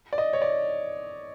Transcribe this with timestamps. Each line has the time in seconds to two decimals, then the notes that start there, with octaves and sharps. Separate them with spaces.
0.13 D5
0.18 D#5
0.33 C#5
0.42 D5